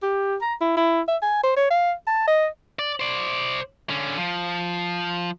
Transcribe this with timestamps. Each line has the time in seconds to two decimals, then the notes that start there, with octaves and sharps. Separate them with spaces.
0.03 G4
0.42 A#5
0.61 E4
0.77 E4
1.08 E5
1.22 G#5
1.43 C5
1.57 C#5
1.70 F5
2.07 A5
2.27 D#5
2.79 D5
3.00 C5 D5
3.89 D3 C#4
4.18 F3